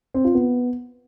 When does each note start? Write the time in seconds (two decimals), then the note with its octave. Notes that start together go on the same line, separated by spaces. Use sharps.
0.14 C4
0.25 F4
0.35 B3